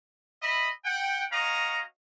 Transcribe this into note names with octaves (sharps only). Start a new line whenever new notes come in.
D#5 E5 B5
F#5 G5
C#4 F#4 D#5 F5 A#5